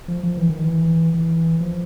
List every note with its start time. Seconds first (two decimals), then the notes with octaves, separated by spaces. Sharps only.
0.08 F3
0.23 F3
0.37 E3
0.49 D#3
0.63 E3
1.14 E3
1.60 F3